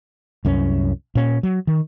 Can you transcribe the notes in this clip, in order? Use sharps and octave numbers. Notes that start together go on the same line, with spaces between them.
C2 F#2 C#4
A#2 C#4
F#3
D#3